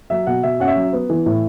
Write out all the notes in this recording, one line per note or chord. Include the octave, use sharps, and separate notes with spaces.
F#3 E5
B2 F#5
B2 E5
C#4 F#5
E5
F#3
B3
E3
A2